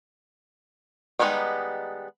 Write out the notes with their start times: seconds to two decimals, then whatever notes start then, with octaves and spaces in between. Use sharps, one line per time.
1.19 D#3 G3 G#3 B3 D#4